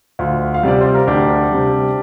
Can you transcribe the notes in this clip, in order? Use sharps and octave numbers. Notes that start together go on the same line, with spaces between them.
D2 F4
F5
C3 G3 D5
C5
A#4
D2 D4 G4
C3 G3